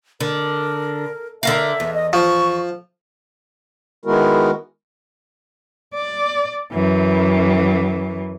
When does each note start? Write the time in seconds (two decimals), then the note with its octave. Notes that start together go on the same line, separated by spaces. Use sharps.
0.20 D3 A#4
1.43 D3 A#4 E5 F5
1.80 E2
1.94 D#5
2.13 F3 C#6
4.05 D#3 G#3 B3 E4 F#4 A#4
5.94 D5
6.73 F#2 E3